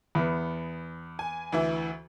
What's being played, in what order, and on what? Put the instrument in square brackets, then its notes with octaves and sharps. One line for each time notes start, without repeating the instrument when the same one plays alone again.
[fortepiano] E2 B3
[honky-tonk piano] G#5
D2 E3 E4